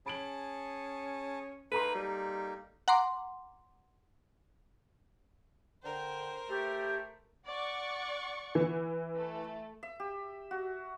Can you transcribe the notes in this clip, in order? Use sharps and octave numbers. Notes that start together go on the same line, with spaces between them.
C#4 G#4 A5 B5 D7 F#7
A#3 D#4 A4 B4 A#5 C6
G3
F#5 A#5 C6 D6
D3 A#4 C5 G5
A3 G4
D5 F#5 C#6
E3
A3
E5
G4
F#4